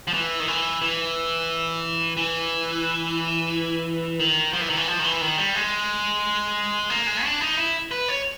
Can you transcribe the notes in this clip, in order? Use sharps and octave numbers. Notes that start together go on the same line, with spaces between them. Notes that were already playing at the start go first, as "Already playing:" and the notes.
F3
E3
D#3
E3
E3
E3
D#3
F3
E3
D#3
E3
F3
D#3
E3
D#3
G3
G#3
A#3
G#3
D4
D#4
E4
B4
C#5